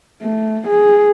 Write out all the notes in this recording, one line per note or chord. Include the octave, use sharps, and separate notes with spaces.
A3
G#4